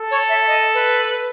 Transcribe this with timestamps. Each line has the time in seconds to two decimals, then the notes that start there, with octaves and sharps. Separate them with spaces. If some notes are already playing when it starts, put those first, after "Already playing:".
Already playing: A4
0.11 C#5
0.29 E5
0.47 D#5
0.74 B4